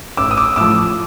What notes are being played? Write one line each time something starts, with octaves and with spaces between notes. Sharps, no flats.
A1 D6 E6
D#6
D6 E6
A2 F3 D6 E6